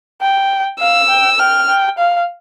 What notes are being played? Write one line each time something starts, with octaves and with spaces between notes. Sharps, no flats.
G5
F5 E6
G5
G5 F6
G5
F5